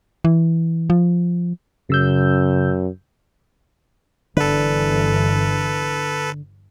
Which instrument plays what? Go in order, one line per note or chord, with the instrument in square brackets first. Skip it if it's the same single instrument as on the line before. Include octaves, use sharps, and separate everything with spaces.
[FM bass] E3
F3
[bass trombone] F#2 [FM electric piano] C#3 E6 G6
[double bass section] G1 E3 [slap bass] D3 [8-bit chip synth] A4 B4